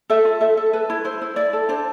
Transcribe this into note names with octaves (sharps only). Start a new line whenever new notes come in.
A4 E5
F4
A4 E5
A4
A4 B4
E4
E4 C5
E4
E4 D5
A4
D4 C5